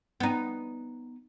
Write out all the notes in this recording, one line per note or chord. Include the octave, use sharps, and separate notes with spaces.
B3 D#4